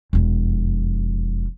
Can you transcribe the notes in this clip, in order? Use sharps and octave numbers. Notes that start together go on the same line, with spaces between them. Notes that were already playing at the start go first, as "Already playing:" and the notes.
E1 F2